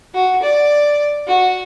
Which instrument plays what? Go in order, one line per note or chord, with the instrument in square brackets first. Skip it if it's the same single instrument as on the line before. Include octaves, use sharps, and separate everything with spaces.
[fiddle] F#4
D5
F#4